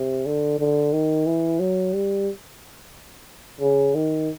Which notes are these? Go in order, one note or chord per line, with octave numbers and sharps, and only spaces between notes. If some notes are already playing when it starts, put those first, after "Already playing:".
Already playing: C3
D3
D3
D#3
E3
F#3
G3
C#3
D#3